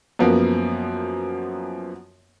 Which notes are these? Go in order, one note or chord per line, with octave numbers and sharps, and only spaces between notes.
F#2 F3 A#3 B3